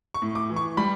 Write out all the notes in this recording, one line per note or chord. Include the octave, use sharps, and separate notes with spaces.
C#6
A2
D6
E3
C#6
G3 B5